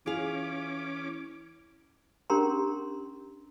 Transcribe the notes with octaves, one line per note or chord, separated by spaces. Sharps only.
E3 C#4 F4 G#4 F5 D6
C#4 D4 G4 A#4 A#5 C6